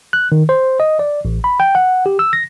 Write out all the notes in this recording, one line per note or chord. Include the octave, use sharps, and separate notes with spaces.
F#6
D#3
C5
D#5
D5
A1
B5
G5
F#5
G4
E6
A#6